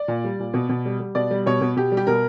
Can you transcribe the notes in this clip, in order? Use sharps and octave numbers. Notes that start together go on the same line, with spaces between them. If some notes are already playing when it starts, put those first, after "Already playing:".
Already playing: D5
A#2
G3
A#2
B2
B2
G3
G3
B2 D5
G3
B2 C#5
B2
B2 G4
G3
G4
B2 A#4